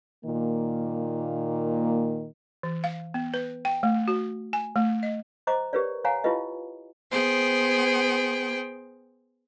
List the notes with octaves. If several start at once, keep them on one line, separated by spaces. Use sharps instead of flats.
A#2 D#3 A#3
E3
F5
B3
B4
G5
A3
F#4
G#5
A3
D#5
C5 D#5 A#5 D6
G4 A#4 B4 C#5 D5
C#5 F5 F#5 G#5 A#5
E4 F4 G4 B4 D#5
B3 G#4 C5 G5